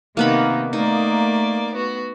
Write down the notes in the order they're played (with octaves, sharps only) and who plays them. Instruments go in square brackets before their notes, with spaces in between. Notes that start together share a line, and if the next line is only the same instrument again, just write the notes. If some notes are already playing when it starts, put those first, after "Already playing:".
[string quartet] C3 D#3 D#4 [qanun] A#3 B3 B5
[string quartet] A3 A#3 D5 [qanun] D#4
[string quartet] B3 F#4